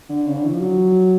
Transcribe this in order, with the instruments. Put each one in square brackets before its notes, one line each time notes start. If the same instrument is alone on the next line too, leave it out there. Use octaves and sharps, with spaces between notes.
[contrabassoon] D3
C#3
D3
E3
F3
F#3